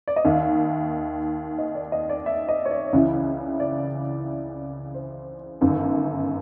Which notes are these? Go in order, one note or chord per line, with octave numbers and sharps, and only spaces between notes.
D5
D#5
D#2 D#3 E5
D#5
D5
D#5
D5
E5
D#5
C#5
D5
C#2 C#3 E3
D5
C5
G1 F#2 D#3